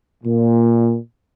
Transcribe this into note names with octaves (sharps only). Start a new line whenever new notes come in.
A#2